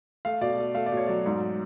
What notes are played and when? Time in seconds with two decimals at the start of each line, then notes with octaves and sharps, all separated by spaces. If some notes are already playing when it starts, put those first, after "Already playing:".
0.25 A3 F5
0.41 B2 D5
0.58 A3
0.75 A3 F5
0.86 D5
0.92 B2
0.97 C#5
1.07 F#3 D5
1.26 G#2